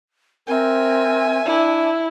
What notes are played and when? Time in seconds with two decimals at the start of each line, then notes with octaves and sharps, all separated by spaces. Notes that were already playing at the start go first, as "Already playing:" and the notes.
0.48 C4 A#4 E5 G#5
1.45 D4 E4